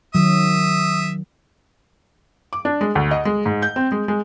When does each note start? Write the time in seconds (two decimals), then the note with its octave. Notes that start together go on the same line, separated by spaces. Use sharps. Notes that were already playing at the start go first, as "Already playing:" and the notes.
0.15 D#3 F#3 E5 D#6
2.53 D6
2.65 D4
2.81 G#3
2.95 D2
3.11 D#5
3.25 G#3
3.46 G#2
3.62 G6
3.76 C4
3.92 G#3
4.08 G#3